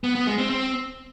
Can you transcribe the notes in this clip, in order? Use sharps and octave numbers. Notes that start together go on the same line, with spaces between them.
B3
B3
G#3
C4
C4